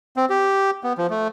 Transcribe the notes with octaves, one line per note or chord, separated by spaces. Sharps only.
C4
G4
B3
F3
A3